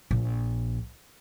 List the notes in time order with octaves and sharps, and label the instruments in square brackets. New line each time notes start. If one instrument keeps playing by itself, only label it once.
[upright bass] A#1